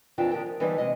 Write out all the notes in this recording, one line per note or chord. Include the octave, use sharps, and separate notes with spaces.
F2 D#3 E3 D4 F4 G5
D#3 D4 G4 A#4 G5
F3
D3 E3 G3 B3 D#4 C5
C3 G#3 D#5